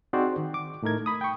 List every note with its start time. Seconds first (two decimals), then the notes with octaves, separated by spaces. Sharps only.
0.13 C4 D#4 F#4 G#4 C5 D5
0.37 D#3
0.54 D6
0.83 A2 A3 D#4 A#4 G#6
1.06 B5 D#6
1.21 G5 C#6